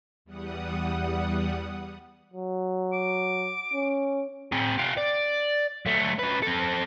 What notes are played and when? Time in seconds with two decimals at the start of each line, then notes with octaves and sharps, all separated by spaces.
0.25 E2 G3 F#5 D#6
2.33 F#3
2.93 D6
3.73 C#4
4.52 C4 G#4
4.78 F4 G4
4.97 D5
5.86 F#3 A3
6.19 C#3 B4
6.42 C4 A4